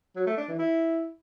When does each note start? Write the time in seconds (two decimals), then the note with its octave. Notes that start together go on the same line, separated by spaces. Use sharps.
0.16 F#3
0.27 A3
0.37 D4
0.48 E3
0.59 E4